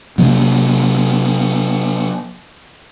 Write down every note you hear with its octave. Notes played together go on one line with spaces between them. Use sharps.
C3 F#3 A#3